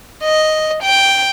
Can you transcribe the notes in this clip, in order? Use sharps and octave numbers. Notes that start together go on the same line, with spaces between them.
D#5
G5